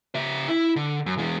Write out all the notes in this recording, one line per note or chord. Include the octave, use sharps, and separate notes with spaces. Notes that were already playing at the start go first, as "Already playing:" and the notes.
C#3 E5
E4
D3
F#2
E2 G#3